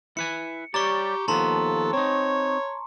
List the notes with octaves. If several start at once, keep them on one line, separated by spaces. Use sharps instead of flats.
E4 B4 G#5 C#7
G3 G4 C#5 D5 A#5 C#6
D#2 F3 B3 A4 A5 A#5 C6
C4 D#4 C#5